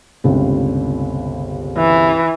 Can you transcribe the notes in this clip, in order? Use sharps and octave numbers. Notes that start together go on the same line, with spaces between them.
G1 C#2 C3
E3